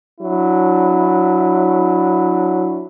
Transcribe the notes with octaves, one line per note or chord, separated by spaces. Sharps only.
F#3 D4 E4